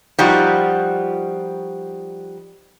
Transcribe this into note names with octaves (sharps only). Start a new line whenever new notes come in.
F3 G3 D#4 F#4